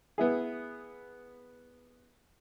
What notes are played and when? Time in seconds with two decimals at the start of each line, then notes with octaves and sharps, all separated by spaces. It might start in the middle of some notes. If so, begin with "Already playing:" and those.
0.18 B3 E4 G#4